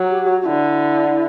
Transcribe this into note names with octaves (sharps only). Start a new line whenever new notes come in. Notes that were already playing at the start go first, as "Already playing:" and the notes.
Already playing: F#3
G4
G4
F#4
F#4
D3 E4